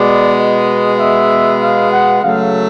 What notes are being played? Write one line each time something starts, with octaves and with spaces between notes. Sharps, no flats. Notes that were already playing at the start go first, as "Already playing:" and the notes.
Already playing: B2 G#3 B3 D5
D#5
E5
F5
F#5
C#3 F#3 A3 F5